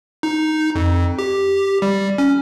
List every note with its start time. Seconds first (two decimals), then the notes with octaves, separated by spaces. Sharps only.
0.23 D#4
0.75 F2
1.19 G4
1.82 G3
2.18 C#4